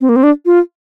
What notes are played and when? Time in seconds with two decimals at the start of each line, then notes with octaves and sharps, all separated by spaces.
0.01 C4
0.09 A#3
0.16 C4
0.23 D4
0.46 F4